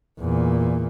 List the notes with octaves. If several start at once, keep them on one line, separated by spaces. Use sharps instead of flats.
E2 A#2